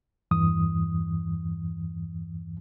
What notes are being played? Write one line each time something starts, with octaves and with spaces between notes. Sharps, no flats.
E2 G2 E3 D#6